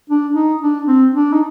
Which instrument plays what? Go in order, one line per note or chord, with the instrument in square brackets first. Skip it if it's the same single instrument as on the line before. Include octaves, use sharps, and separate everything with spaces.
[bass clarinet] D4
D#4
D4
C4
D4
D#4